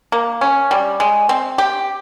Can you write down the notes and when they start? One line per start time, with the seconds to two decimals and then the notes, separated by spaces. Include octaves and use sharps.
0.12 A#3
0.41 C#4
0.71 G3
1.00 G#3
1.29 C4
1.58 G4